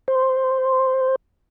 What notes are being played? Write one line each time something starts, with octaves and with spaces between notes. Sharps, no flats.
C5